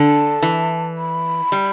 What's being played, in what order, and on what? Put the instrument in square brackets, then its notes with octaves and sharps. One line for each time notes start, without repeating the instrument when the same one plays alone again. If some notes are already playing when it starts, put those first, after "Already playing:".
Already playing: [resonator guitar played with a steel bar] D3 [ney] A5
[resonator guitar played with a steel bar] E3
[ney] B5
[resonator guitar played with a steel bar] G3